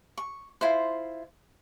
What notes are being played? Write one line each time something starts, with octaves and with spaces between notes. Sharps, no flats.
C#6
E4 F4 C5